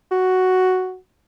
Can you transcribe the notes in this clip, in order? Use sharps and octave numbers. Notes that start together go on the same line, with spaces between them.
F#4